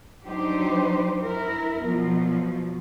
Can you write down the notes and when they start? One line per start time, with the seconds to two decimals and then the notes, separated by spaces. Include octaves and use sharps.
0.27 F#3 D4 D#4 G4 C5
1.22 E4 A#4
1.82 B2 F3 F#3